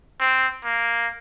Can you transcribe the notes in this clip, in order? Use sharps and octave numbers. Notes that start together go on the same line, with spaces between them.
C4
A#3